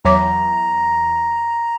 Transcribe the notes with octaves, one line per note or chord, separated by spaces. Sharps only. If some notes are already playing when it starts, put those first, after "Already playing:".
E2 F#3 C#5 A#5 D6